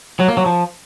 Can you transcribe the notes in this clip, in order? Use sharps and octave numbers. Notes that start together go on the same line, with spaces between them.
F#3
A#3
F#3
F3